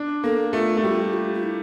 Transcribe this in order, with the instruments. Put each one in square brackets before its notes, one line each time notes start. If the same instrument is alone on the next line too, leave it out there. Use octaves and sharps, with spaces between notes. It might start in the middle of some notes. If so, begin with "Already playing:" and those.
Already playing: [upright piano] D4
[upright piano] A#3 [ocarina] A4
[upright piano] A3 [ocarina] F4
[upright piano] A3
[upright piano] G3 [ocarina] F4
[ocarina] G4
F4
F4
E4